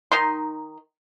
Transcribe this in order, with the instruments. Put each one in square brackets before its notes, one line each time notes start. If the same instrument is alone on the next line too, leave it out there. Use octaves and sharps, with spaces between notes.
[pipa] D#3 D#4 C6